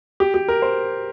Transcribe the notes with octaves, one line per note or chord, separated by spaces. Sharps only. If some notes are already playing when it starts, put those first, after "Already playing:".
G4
G4
A#4
C5